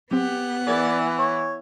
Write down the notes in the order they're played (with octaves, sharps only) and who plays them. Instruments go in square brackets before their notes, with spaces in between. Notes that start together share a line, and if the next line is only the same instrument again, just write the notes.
[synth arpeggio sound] F#3 C4 [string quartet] B3 F#5 [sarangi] G4
[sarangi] E3 [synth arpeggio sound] G#4 A#4 G#6 [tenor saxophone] D5
[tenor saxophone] C#5